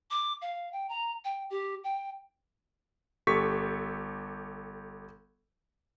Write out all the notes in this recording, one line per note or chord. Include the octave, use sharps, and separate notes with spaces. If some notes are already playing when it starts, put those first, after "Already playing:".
D6
F5
G5
A#5
G5
G4
G5
G1 G4 A4 C#6 B6